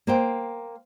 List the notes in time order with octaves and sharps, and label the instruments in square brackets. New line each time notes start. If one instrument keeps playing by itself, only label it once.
[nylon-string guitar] A#3 C5 G5